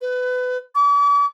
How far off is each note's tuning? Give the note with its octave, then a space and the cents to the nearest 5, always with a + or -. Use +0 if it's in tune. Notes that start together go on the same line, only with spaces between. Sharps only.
B4 +25
D6 -45